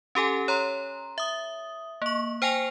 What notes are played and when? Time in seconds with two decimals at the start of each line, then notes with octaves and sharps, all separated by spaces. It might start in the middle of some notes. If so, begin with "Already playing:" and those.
0.15 C#4 G4 A4 G#5
0.48 C#5 A#5 C6
1.18 E5 D#6
2.02 A#3 C#6
2.42 C5 G5 G#5 A#6 F7